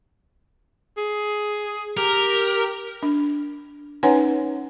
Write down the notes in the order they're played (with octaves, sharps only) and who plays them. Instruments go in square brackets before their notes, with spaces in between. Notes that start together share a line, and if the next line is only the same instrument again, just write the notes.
[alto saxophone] G#4
[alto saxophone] G4 [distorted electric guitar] A#4
[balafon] D4
C#4 D#4 B4 C#5 F#5 G#5